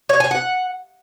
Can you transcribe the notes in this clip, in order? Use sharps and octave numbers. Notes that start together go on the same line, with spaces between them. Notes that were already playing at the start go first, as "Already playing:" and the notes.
C#5
G#5
F#5